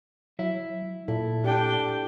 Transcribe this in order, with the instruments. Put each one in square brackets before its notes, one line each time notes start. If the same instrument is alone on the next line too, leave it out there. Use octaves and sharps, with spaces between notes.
[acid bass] F#3 [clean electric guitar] E4 E5
[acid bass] A#2 [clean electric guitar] E4 [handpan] A4
[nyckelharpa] D4 G5 [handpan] G4 A4